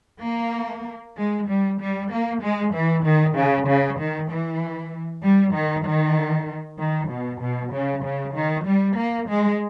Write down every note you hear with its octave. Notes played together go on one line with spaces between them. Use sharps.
A#3
G#3
G3
G3
A#3
G#3
E3
D#3
C#3
C#3
D#3
E3
G3
D#3
D#3
D#3
B2
B2
C#3
C#3
D#3
G3
A#3
G#3